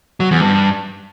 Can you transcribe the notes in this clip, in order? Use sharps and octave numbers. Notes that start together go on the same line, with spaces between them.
F#3
E2
G2